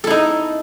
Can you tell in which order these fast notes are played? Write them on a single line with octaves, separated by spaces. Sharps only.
A4 E4 D#4